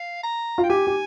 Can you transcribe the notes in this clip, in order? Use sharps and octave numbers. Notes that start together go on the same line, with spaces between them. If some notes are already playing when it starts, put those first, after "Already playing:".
Already playing: F5
A#5
F4
G5
G4 G#5
G4